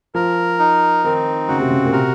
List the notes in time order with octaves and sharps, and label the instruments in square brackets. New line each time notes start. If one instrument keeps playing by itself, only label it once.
[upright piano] F3 [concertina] A#4
[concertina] D#4
[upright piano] D#3 [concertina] C4
[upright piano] C#3 [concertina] F#4
[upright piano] C3
C#3
A#2
[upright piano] C3 [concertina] A#4